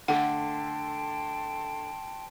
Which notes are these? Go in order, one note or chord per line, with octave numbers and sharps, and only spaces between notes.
D3 A3 F#5 G5 A5 C6